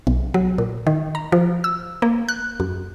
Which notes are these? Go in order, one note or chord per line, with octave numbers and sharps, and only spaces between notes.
B1
F#3
A#2
D#3
A#5
F3
E6
A#3
F#6
F#2